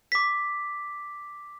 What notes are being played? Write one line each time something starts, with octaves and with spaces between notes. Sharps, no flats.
D6 B6